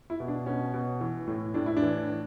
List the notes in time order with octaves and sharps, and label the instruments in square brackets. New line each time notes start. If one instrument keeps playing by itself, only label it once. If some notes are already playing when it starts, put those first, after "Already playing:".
[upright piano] E4
B2
D4
B2 C#4
B2
E3
A2
A2 D4
E4
D4
E3
E3